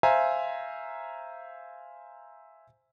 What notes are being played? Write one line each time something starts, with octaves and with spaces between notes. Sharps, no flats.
C5 E5 F5 G#5 A#5